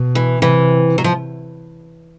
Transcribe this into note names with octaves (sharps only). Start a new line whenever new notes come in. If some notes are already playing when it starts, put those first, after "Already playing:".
Already playing: B2
E3
C3 E3
F#3
F3